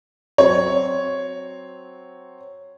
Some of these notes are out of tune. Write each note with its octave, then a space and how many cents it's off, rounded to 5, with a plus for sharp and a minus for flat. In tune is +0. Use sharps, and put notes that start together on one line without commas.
F#3 +0 C4 +0 C#5 +0